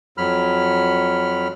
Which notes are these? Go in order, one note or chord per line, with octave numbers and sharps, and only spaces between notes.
F2 F#3 B5 F6